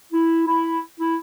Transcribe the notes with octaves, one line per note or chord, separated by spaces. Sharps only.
E4
E4
E4